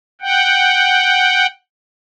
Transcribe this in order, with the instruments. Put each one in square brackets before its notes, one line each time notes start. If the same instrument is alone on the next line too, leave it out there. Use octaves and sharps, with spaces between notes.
[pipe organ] F#5 G5